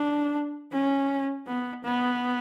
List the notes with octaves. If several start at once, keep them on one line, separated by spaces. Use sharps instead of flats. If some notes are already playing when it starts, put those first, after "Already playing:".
Already playing: D4
C#4
B3
B3